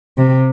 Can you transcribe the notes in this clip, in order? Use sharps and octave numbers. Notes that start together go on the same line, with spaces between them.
C3